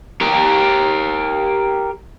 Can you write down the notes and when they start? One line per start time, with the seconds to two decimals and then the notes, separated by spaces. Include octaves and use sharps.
0.21 G4 A#4